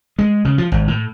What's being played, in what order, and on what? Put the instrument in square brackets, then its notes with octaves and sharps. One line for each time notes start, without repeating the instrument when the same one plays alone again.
[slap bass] G#3
C#3
F3
G#1
A2